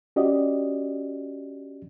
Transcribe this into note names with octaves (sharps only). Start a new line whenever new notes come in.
C#4 F#4 G4 D5 D#5